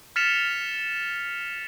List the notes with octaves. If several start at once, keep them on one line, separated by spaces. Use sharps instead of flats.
F6 A6 B6 C#7 E7 F7